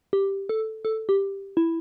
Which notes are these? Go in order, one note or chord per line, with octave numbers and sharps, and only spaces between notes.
G4
A4
A4
G4
E4